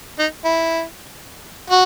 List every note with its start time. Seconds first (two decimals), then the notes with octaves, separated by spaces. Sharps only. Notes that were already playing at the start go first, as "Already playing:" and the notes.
0.19 D#4
0.45 E4
1.70 F#4